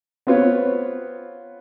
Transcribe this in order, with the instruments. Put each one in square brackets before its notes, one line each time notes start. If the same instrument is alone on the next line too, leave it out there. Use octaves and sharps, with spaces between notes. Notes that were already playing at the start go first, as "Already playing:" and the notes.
[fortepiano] B3 C4 F4 B4 C#5